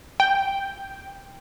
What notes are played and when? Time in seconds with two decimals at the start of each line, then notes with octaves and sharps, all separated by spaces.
0.20 G5